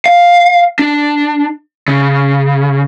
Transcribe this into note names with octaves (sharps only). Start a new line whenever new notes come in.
F5
D4
C#3